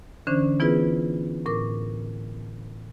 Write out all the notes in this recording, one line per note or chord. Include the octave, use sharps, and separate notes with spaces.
D3 E3 C#4 D4 C5
E3 B3 E4 F4 G#4 B4
A2 A#4 D6